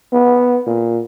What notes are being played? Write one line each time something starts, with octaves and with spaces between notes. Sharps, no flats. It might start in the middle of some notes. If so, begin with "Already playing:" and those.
B3
A#2